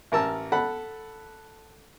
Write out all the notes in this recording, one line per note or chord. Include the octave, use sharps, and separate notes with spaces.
A1 A#4 A5 E6
A4 F#5 B5